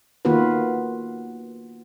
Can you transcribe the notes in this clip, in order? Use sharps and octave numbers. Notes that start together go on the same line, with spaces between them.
D#3 A#3 B3 F4 F#4 B4